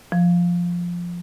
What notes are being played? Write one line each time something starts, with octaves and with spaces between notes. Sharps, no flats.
F3